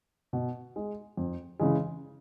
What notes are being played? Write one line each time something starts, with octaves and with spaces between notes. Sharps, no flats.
B2
G#3
F2
C#3 E3 G#3